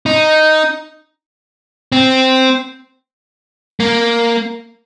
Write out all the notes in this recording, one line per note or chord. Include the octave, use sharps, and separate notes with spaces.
D#4
C4
A#3